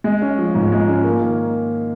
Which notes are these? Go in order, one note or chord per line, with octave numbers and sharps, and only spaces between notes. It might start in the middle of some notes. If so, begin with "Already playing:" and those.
G#3
C#4
F3
G#2
G#3
C#4
A#3
D#3